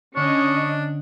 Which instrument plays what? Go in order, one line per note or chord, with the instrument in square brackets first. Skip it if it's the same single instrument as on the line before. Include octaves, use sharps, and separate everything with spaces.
[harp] D3 [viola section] C#4 D#5 [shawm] D4 [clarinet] C#6